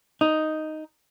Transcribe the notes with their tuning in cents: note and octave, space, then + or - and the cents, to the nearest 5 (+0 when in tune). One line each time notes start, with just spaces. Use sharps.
D#4 +0